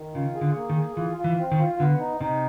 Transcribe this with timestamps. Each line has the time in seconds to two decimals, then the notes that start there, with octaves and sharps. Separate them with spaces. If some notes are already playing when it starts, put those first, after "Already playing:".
Already playing: D#3
0.15 C#3 F4
0.35 G#4
0.41 D3
0.56 A#3
0.70 D#3
0.76 G#4
0.97 E3 F4
1.18 F4
1.24 E3
1.38 C4
1.52 D#3
1.59 F4
1.79 D3 B3
2.00 D#4
2.21 C3 D#4